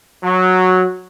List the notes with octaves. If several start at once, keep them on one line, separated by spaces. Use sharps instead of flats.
F#3